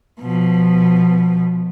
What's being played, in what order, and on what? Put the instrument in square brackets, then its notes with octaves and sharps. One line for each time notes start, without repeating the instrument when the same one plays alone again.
[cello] B2 F3